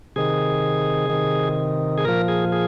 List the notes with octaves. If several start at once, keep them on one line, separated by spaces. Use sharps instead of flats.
C3 D#3 G#4
C3 D#3
G#4
A#2 F3 A#4
G#4
G#4